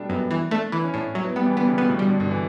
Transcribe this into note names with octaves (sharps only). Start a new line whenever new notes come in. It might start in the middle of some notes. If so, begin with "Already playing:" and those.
Already playing: B2 G3 A3 D4
F#2 B3
E3
A3 D4
E3 E4
C#4
A2 D4
F#3 E4
B3
G3 B3
E3
D3 B3
C#3
B2 B3
A2
B2 G3
D3
G2 D3
E3